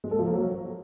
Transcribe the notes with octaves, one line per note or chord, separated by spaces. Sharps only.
G#3
A4
F3
A#3
F#3